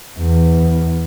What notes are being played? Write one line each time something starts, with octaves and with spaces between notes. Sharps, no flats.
E2